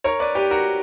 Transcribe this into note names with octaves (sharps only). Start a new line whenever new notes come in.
A#4 C#5
B4 D5
G4 B4
F#4 A#4